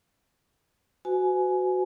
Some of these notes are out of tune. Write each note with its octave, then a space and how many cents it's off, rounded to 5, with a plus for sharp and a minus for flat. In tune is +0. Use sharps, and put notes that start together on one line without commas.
F#4 +0 B4 +45 G#5 +20